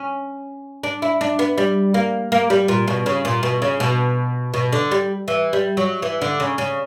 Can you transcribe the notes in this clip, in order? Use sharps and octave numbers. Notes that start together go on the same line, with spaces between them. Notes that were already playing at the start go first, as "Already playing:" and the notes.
Already playing: C#4
D4
E4
D4
B3
G3
A#3
A#3
G3
A#2
B2
C#3
A#2
B2
C#3
B2
B2
D3
G3
E3
G3
F#3
E3
D3
C#3
C#3